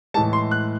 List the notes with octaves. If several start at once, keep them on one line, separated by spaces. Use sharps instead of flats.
A2 E3 G#3 A5
C6
F#6